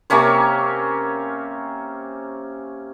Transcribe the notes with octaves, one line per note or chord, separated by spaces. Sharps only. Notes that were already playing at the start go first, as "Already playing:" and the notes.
C3 A#3 C#4 C#5